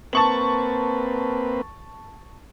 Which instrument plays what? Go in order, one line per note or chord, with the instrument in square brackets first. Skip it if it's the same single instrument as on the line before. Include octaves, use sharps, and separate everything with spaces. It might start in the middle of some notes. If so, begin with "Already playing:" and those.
[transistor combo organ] A#3 C4 B4 [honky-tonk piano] A5 C#6 F#7